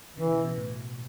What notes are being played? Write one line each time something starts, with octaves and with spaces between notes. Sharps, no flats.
C#3 E3
C#3
B2
B2
A2